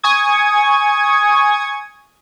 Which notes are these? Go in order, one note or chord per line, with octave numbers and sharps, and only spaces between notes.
G#5 C#6 D#6 G#6